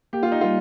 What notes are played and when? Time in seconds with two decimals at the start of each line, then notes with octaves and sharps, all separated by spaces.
0.13 A#3 G4
0.23 F4
0.32 D#4
0.41 G3 F4